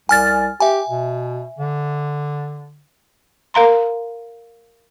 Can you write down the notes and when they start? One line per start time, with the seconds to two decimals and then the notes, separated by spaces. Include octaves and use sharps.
0.09 C2 G#5 F6 A6
0.60 G4 E5 G#5
0.89 B2
1.59 D3
3.54 A#4 F5 A#5 C6